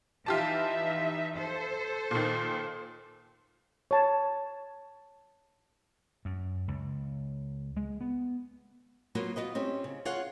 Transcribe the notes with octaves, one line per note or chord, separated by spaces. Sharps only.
E3 D#4 F4 G4 E5 A5
A4 C5
A#2 D#3
C#5 A5
F#2
C#2
G#3
B3
F#3 A#3 B3 F4 F#4
F4 F#4 B4 D#5
C4 C#4 G4
C#3
F4 G#4 C#5 F5 F#5